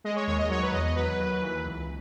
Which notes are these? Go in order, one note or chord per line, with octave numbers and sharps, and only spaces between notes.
G#3 D#5
C#5
D#2 C#5
D#5
F#3 C#5
B4
E2 D#5
D#5
F#3 B4
D#2
E3
C#2